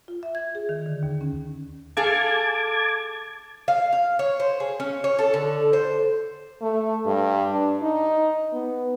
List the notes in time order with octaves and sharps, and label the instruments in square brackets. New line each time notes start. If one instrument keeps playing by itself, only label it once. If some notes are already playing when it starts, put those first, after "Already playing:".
[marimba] F4
E5
G#6
G#4
D#3
D3
D#2
C#4
[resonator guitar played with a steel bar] G#4 A4 F5 [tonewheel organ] A5 D6 G#6
[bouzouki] F5
F5
C#5
C5
G#4
C#4
C#5
A4
D3
C5
[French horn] A3
G2
D4
D#4
B3